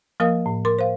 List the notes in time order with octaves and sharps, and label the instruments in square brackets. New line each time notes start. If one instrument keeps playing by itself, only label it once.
[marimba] F3 A#3 A#4 F5 D#6
A2
A#4 C6 D6
C5 F5